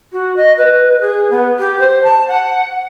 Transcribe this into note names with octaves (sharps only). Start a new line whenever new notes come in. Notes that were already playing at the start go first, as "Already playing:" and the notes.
F#4
D#5
B4
G#4
B3
G4
C5
A5
F#5